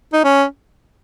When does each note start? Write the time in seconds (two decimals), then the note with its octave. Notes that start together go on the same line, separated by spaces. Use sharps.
0.13 D#4
0.24 C#4